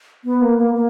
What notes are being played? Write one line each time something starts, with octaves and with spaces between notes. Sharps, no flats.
B3
A#3
A#3
A#3